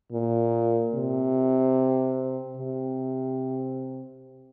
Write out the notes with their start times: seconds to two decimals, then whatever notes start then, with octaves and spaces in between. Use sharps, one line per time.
0.12 A#2
0.94 C3
2.57 C3